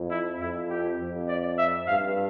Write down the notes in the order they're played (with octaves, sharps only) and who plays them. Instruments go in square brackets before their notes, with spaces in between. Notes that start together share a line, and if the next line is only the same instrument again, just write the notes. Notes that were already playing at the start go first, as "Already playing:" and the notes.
Already playing: [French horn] F2
[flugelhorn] E4
[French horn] F2 [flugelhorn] E4
[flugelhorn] G4
[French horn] F2
[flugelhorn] D5
E5
[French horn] G2 [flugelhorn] F5